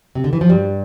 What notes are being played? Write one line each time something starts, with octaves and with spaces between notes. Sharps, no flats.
C3
D3
E3
F3
G2 G3